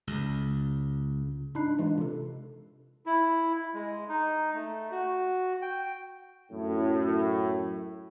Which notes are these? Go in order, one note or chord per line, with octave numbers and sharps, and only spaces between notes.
C#2
G#2 D4 D#4 B5 F#6 C7
E3 G#3 D4 F4
C3 A4
E4
G#3
D#4
A3
F#4
G5
F#2 A2